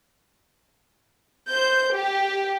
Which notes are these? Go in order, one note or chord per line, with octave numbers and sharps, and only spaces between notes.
C5 G6
G4